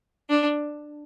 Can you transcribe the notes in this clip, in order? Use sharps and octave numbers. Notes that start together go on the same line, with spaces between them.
D4